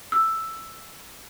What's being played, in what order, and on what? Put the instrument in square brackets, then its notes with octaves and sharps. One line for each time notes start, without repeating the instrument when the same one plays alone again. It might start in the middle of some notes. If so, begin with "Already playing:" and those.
[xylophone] E6